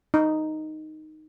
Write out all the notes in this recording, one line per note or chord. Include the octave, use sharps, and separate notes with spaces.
D#4